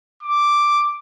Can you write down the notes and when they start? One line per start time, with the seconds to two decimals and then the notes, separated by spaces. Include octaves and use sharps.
0.23 D6